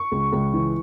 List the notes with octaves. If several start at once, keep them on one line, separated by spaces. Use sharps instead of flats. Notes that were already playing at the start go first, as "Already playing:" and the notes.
Already playing: C#6
C#2
C#2
E3